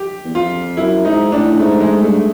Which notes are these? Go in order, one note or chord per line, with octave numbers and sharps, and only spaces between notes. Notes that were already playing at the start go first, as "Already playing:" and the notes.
Already playing: G4
E2
F2 F4
F#2 E4
G#2 D#4
A2 D4
G#2 A3
G#2 G#3
G2 A3